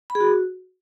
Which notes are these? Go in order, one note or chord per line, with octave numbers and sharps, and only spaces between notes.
B5
G#4
F#4